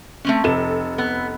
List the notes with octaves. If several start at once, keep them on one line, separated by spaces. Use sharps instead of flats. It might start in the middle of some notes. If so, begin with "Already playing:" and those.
A3 C4 C#4
F1 C3 A4 E7
B3